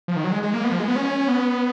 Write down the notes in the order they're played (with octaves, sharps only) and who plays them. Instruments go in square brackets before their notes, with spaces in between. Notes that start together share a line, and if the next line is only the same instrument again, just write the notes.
[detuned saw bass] F3
D#3
F#3
G#3
G#3
A#3
B3
F3
G#3
B3
C#4
B3